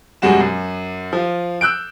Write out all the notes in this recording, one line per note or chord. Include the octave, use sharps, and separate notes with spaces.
E1 F#2 G3 G#3 F#4 E7
F#2
F3 F4
E6 F#6 G6 D7